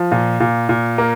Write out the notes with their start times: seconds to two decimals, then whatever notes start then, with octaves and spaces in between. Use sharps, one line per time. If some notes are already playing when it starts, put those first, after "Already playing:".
Already playing: F3
0.12 A#2
0.40 A#2
0.69 A#2
0.98 A#3